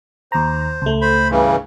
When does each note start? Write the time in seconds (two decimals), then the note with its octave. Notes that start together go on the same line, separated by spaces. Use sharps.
0.32 D#2 C5 A#5
0.82 C#2 A3
1.01 C5 B5
1.31 G2 C#3 E3